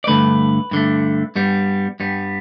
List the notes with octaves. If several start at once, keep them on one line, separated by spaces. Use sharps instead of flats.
D5
G2 D3 A3 B4
G2 D3 A3
G2 G3 B3
G2 G3 B3